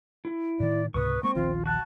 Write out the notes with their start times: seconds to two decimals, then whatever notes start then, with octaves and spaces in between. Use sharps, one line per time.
0.25 E4
0.60 A2 D#3 D5
0.94 C#2 G#2 C3 B4 C#6 D#6
1.23 G#3 A#3 C4 C#6
1.35 D#1 A#1 D#3 F4
1.66 F#4 A5 F#6